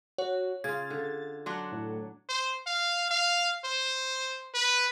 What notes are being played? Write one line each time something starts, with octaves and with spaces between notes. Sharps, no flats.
F#4 C#5
C#3 F4 G#6 A6
D3
F#3 D4 F#5 C6
A2
C5
F5
F5
C5
B4